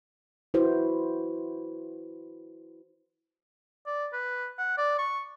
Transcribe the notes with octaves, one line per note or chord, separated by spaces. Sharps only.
E4 F#4 B4 C5
D5
B4
F#5
D5
C#6